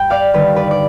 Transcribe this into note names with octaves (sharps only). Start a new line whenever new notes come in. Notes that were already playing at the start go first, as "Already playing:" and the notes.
Already playing: G2 G5 B5
D5 F5
D#2 D3 G3 B4
B4 D5
D5